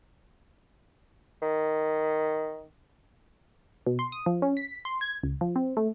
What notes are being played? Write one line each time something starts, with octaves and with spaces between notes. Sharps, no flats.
D#3
B2
C6
D#6
F3
C#4
B6
C6
G#6
C#2
F3
C4
A3